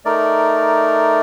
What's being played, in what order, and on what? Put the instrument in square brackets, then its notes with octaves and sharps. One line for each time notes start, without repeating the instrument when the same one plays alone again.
[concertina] A3 D#4 A#4 D5